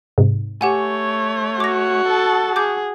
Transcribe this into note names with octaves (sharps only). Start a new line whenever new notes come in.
G#2 C3
A3 G4 C#5 F#5 G#5
F#4 D6 A#6
A4 A5
G#4 D6 G6